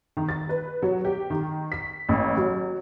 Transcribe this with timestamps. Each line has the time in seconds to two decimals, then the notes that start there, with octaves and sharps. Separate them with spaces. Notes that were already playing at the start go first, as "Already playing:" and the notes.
0.17 D#3
0.29 A6
0.49 B4
0.82 F#3
1.05 G4
1.30 D#3
1.72 B6
2.09 A1
2.37 F#3